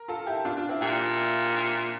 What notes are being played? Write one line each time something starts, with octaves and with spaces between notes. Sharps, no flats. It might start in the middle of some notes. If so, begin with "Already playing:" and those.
Already playing: A#4
F4 A4
E4 G4
D4 F4
D4 F4
C4 E4
A#2 E4 G4